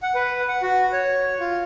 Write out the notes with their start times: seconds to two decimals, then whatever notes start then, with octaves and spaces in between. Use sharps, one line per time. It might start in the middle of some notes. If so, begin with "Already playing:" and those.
0.03 F#5
0.15 B4
0.48 F#5
0.62 F#4
0.93 C#5
1.40 F4